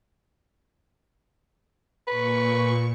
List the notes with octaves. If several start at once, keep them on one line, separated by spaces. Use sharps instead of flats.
A#2 B4 C#6